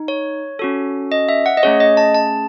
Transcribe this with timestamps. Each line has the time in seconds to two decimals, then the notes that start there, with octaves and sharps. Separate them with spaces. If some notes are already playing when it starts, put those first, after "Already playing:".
Already playing: D#4
0.08 C#5
0.59 C#4 F#4 A4
1.12 D#5
1.29 E5
1.46 F#5
1.57 D#5
1.63 A3 C#4 G#4 C#5
1.80 D#5
1.97 A5
2.14 A5